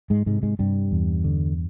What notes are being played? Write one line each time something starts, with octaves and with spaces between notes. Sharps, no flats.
G#2 G#3
G#2 C3 G#3
G#2 G#3
G2 C3 G3
E2
D3